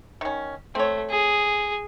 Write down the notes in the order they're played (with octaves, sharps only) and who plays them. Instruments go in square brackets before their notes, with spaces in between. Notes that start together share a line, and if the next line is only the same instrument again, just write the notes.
[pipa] D#3 C#4
[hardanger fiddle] A3 [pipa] C4 C#5
[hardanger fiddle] G#4